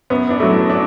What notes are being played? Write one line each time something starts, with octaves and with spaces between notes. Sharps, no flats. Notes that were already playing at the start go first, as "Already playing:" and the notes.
F#2 B3
D4
F#3 A3
E4
D4